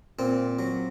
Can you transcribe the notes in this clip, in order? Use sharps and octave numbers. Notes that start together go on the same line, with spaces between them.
A#2 C4
F#3